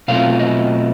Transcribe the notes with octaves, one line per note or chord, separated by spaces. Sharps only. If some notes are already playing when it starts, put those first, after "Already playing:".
B2 F#3 A3 C4 F4 F5
D#5